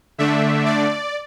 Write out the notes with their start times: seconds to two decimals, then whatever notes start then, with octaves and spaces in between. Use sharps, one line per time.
0.18 D3 A3 D4 E5
0.66 D5